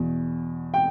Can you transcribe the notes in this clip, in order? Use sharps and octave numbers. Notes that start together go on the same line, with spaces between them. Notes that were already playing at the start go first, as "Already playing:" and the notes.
Already playing: E2 B2
G5